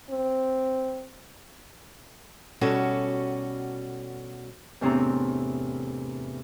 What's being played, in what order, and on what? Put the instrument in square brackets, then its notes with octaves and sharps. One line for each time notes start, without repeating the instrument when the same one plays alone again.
[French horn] C4
[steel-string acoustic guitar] B2 G3 C#4 F#4 A4
[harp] E2 A2 C3 C4 D4 A#5